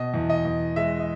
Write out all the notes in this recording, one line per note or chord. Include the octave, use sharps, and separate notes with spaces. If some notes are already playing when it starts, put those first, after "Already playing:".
Already playing: B2 D#5
E2
D#5
E2
G#3 E5
D#5